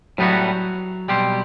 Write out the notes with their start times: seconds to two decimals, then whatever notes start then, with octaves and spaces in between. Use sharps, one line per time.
0.18 A2 F#3 G3 B3 F#4
1.08 B2 G3 C4 G4 C5